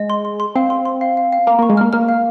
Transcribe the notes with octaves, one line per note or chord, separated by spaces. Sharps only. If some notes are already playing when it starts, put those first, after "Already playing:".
Already playing: G#3 D#5
C6
C6
C6
C4 F5
C6
C6
F5
F5
F5
A#3 A#5
A#3 C#6
G#3
A#3 F6
A#3 F6
F5